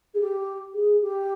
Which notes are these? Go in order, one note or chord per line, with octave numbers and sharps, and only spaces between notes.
G#4
G4
G#4
G4